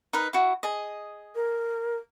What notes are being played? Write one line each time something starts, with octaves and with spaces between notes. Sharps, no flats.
D#4 A#4 B4
E4 F#4
G#4 D#5
A#4